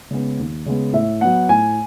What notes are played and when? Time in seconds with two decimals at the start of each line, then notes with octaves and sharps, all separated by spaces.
0.11 C#3 G#3 B3
0.39 D#2
0.66 C#3 G#3 B3
0.93 A2 E5
1.21 F#3 B3 F#5
1.49 A2 G#5